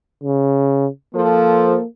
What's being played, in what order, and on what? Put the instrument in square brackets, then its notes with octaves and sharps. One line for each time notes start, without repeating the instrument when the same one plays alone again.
[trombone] C#3
[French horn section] F3 A4 [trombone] A#3